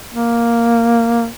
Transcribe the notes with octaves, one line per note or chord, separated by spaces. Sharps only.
A#3